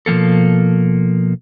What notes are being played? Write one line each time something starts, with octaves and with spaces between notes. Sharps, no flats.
B2 F3 G3 A#3 A4